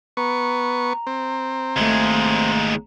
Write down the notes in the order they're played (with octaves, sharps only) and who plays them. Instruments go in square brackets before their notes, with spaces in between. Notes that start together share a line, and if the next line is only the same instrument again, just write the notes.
[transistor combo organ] B3 C#6 [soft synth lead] A#5
[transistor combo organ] C4
[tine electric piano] G#1 A3 [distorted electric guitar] D#2 G#3